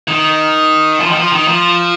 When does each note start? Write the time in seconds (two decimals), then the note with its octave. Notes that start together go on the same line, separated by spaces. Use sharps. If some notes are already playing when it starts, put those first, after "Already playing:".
0.08 D#3
1.00 F3
1.10 D#3
1.17 F3
1.32 D#3
1.48 F3